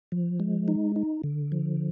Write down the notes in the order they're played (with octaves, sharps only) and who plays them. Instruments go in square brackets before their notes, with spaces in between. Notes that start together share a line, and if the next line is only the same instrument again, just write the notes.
[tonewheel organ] F3
G#3
D#4
D#4
D3
F3